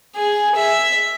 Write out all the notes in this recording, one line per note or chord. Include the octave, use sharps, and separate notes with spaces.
G#4
E5